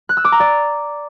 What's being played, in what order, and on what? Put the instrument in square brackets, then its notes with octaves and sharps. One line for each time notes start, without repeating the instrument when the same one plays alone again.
[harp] F#6
E6
D6
A#5
D5